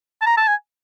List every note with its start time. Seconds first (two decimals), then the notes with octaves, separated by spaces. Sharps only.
0.22 A5
0.26 A#5
0.37 A5
0.48 G#5